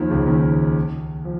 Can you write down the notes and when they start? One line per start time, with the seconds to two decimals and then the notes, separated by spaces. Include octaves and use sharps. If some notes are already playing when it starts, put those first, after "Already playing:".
Already playing: D#2 D#3 F3
0.10 C#2 C#3
0.27 D#2 D#3
1.25 F3